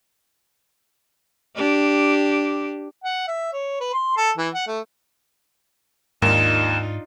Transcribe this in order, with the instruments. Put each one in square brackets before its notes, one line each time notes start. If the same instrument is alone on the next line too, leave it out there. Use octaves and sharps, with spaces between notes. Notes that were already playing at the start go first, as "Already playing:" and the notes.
[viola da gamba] D4 G4
[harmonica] F#5
E5
C#5
B4
C6
A4
E3
F#5
A3
[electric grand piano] D#2 A#4 [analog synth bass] G#2 [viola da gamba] D4 D#4 F4 [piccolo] E7